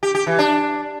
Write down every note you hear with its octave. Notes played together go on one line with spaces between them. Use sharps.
G4
G4
E3
D4